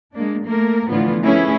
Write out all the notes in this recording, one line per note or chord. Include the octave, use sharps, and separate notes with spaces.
G#3 A#3 D4
A3 A#3 A#4
A2 D3 E3 F3 B3 F4
F3 A3 C#4 E4 G#4 B4